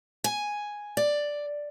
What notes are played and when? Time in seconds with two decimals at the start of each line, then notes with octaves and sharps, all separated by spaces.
0.24 G#5
0.97 D5